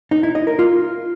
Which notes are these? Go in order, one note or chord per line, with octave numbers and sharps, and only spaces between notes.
D#4
E4
D#5
A#4
F4